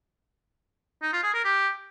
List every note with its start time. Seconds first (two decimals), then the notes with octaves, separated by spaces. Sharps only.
1.02 D#4
1.13 F4
1.23 G#4
1.34 A#4
1.45 G4